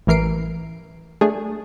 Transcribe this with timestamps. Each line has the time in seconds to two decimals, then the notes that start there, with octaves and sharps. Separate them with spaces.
0.07 A1 E3 A#4 C7 D7
1.21 A3 D4 G#4